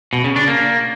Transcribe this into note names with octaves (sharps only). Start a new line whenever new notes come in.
B2
C#3
D4
A#3